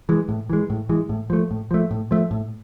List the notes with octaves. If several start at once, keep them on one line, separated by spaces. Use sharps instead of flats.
E3 G#3
A2
E3 G#3
A2
E3 G#3
A2
F3 A3
A2
F3 A3
A2
F3 A3
A2